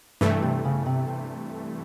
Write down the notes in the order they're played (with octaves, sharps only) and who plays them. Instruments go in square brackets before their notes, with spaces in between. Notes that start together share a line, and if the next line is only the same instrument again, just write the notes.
[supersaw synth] G2 E3 A3 [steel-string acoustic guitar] C3
[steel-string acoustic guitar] C3
C#3
C3
C3